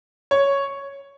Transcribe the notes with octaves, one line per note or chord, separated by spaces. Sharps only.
C#5